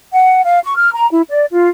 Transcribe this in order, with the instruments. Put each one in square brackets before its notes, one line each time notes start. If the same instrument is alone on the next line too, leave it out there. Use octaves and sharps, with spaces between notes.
[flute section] F#5
F5
C#6
F6
A#5
E4
D5
F4